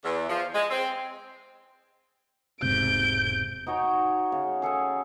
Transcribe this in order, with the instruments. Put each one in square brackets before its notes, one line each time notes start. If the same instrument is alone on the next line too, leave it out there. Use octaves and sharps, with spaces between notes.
[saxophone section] E2
F3
G#3
C4
[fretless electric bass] E1 G#2 C3 [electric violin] G6 D7
[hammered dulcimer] D#4 F#4 C#5 G#5
C#3
G#4 A4 F#5 G#5